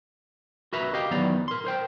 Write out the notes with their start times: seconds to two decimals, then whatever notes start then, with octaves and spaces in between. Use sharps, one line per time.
0.73 F#4 A#4 B4 E5 A#5 B5
0.93 G4 D#5 F5 G5
1.11 E2 D#3 F#3 B3 D5 A#5
1.48 A#4 C6
1.65 A#4 C5 G5